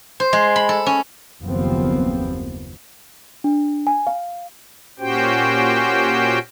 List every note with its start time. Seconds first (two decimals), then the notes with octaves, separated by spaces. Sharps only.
0.20 C5
0.33 G#3
0.56 B5
0.69 A4
0.86 C#4
1.42 F#1 D#2 F3 B3 C4
3.44 D4
3.87 G#5
4.07 F5
4.99 A#2 C#4 F#4 G4 C5 G5